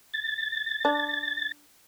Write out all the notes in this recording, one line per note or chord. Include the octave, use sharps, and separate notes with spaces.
A6
D4